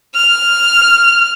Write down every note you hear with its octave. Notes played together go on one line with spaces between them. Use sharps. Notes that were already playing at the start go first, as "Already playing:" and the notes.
F6